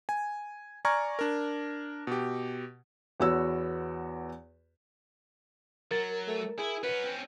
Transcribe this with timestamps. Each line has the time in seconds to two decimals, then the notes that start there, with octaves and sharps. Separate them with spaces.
0.09 G#5
0.85 D5 G#5 A#5 C#6 F6 G#6
1.19 D4 A#4
2.07 B2 G4
3.20 E2 B3 F#4 C#5 E6
5.91 F#3 A#4 A6
6.28 A3
6.59 E4 G#4
6.83 C#4 F#4 B4
7.03 C4 C#4